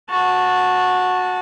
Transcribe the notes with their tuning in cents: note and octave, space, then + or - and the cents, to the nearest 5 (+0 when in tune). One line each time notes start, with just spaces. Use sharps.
F#4 -15 A5 +0